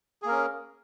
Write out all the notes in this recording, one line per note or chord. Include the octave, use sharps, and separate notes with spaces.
A#3 C#4 G#4 A#4